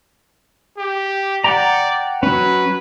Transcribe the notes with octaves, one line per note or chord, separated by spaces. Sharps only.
G4
D5 F#5 G5 A#5
F#3 C#4 B4